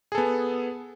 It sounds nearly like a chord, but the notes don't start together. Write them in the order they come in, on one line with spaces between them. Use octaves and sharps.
G#4 A4 B3